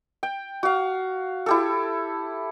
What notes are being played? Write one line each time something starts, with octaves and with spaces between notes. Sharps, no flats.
G5
F#4 F5
E4 G4 A4